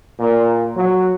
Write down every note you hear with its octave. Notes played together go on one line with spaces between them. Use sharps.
A#2
F#3